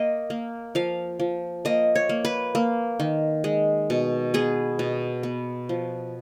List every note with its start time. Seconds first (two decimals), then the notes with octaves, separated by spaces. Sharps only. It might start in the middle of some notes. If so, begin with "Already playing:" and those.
Already playing: A#3 D#5
0.30 A#3
0.75 F3 F5
1.20 F3
1.65 A#3 D#5
1.96 C#5
2.09 A#3
2.25 B4
2.55 A#3
3.00 D#3
3.44 G#3
3.90 B2
4.34 B3 G#4
4.79 B2
5.23 B3
5.69 F3